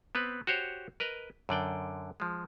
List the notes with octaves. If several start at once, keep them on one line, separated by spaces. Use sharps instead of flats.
B3 C4 B4
F#4 G4 C5 C#5
A#4 B4 D#5 A#5
F#2 D3 D5 G5
F3 G#3